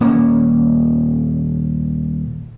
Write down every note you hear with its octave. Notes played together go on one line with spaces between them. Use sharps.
D#1 A#3 C#4